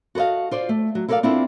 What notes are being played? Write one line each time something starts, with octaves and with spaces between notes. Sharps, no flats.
F#4 A4 B4 D#5 F5
F4 C5 D5
A3
F#3
E4 A4 A#4 C5 D5 F5
C4 D4 E4 F4 A4